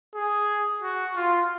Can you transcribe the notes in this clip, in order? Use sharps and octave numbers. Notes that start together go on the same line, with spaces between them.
G#4
F#4
F4